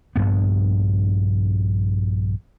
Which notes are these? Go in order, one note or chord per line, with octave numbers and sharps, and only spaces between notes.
A#1 G2 B3